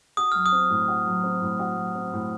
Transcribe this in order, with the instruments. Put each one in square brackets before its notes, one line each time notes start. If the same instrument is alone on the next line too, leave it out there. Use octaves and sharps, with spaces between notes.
[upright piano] F#4 [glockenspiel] D#6
[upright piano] F#3 [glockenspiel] F6
[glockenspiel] D#6
[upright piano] C4
A2
F#4
F#3
C4
A2
F#4
F#3
C4
A2